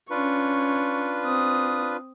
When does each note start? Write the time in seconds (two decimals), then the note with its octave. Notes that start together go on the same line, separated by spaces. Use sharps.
0.10 C#4 D4 F4 B4 C#6
1.25 C4 D#6